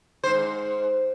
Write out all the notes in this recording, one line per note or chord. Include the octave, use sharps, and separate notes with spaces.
G#2 C5